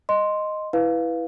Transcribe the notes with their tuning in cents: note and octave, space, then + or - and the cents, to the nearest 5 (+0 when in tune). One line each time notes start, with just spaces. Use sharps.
D#5 +0 C6 +0
E4 +0 B4 +0 F5 +0